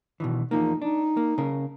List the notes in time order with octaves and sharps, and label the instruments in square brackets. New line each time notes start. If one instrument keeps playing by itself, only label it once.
[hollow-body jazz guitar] B2 D#3 E3
[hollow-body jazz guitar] E2 F3 A#3 [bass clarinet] D#4
[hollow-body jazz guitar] D4 [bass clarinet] D#4
[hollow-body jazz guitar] A#3
C#3 A#4